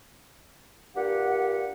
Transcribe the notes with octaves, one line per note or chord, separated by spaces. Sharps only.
G2 A#2 G4 F#5